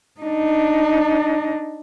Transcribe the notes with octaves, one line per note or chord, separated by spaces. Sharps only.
D4 D#4